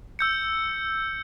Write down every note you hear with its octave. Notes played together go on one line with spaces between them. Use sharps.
E6 G6 C#7